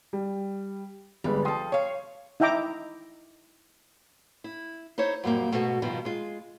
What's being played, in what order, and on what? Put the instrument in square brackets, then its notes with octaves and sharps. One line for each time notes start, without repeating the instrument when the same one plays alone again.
[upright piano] G3
[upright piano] G1 G#3 B4 [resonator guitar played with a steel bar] G3
[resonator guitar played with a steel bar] F3 A4 [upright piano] G5 C6 D#6
[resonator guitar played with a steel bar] C#5 F5
[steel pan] D#4 E4 E5 G5 A#5 D6
[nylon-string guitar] E4
D#4 E4 C5 C#5
F#2 A#2 G3 A3 A#3 C4
G#2 B2 A3 B3 F#4
G2 B2 D#3 F3
G#3 F4